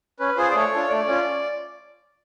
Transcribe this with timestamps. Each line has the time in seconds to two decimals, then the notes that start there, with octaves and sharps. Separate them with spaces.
0.19 C#4 B4
0.37 F4 G#4 C5
0.51 D5
0.55 A3 C#5
0.73 D4 F4 A4
0.90 A3 D5
1.07 C#4 F4